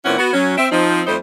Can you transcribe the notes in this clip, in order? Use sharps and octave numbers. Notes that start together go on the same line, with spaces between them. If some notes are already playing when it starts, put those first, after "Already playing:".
A#2 E3 C4 C#4 E4 F#5
B3 F#4
F#3 C#4
C4 E5
F3 C4 D#4
F2 G3 A3 D#4 C5